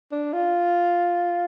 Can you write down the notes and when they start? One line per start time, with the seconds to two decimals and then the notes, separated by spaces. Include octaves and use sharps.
0.12 D4
0.33 F4